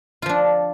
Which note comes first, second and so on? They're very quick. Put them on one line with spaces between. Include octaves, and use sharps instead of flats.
F4 F3 D4